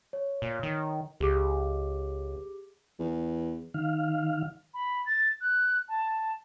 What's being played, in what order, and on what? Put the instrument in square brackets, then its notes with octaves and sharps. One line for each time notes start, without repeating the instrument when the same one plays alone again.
[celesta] C#5
[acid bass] A#2
D#3
[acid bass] C#2 [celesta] G4 G#4 D6
[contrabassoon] E2
[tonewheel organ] D#3 F5
[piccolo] B5
A6
F#6
A5